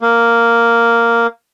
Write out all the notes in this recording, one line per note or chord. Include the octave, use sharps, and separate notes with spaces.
A#3